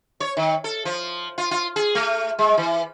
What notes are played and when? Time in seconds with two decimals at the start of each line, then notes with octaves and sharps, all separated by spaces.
0.20 C#5
0.37 D#3
0.64 A4
0.85 F3
1.38 F4
1.51 F4
1.76 G#4
1.95 A3
2.39 G#3
2.57 E3